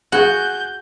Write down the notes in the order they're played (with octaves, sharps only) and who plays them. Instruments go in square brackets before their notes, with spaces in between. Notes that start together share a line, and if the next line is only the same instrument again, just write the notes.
[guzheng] F#4 [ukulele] G#4 [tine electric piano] G#5 F#6 [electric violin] G6